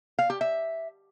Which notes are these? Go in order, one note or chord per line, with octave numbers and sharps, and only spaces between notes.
F5
G4
E5